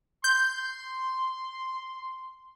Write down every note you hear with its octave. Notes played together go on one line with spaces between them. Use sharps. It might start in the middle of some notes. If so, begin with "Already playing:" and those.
C6 G6